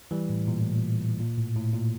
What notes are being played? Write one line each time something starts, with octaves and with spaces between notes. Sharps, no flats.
E3 G3
A2
A#2
A2
A#2
A#2
A2
A2
A#2